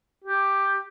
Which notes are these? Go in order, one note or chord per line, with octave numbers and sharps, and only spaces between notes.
G4